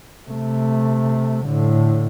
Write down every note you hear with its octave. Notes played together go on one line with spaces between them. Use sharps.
C3 A3
A2 D3